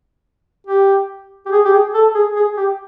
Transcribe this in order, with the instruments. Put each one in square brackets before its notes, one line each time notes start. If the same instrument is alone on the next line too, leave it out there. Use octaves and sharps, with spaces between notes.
[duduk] G4
G4
G#4
G4
G#4
A4
G#4
G#4
G4